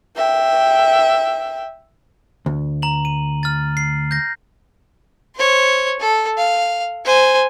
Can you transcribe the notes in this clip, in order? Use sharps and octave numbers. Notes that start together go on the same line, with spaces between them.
E5 G5
D2
A#5 F#7
D#7
F6 A6
C7
G6 A#6
C5 C#5
A4
F5
C5 G#5